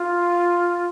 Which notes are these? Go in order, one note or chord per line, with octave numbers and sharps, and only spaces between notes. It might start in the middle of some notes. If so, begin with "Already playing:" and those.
Already playing: F4